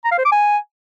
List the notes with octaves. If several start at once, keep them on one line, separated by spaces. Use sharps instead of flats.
A#5
F5
C5
D6
G#5